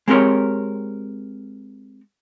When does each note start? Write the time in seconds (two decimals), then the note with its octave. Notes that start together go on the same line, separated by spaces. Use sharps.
0.08 G#3 C4 G4 A#4 C#5